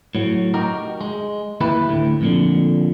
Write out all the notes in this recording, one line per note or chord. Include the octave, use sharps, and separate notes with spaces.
A2 F#3
D#4 F#4 G4 A#4
G#3
D#2 E4 G4 B4
D2 A2
F2 A#2 D3